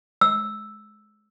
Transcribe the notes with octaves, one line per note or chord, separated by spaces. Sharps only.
E6